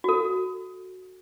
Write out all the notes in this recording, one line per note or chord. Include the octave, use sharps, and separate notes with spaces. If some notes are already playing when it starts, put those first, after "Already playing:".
F#4 A4